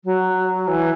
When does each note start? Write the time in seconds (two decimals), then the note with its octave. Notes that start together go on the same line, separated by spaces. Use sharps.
0.04 F#3
0.67 E3